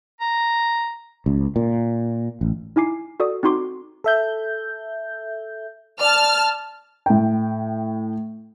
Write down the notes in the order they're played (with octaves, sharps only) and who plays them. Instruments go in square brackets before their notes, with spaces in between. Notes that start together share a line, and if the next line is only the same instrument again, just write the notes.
[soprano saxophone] A#5
[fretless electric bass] C#2
A#2
A1
[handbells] D#4 E4 G#5 D6 C7
F#4 A4 D5 D#6
C4 D#4 F#4 C6 D6
[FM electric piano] A4 E5 G6
[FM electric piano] D5 [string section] A5 F6
[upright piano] A2 G5